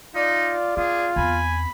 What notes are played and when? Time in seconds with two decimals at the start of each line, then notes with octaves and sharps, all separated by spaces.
0.15 D#4 F4 D5
0.77 C4 F4 G#4
1.16 E2 C4 G#5 B5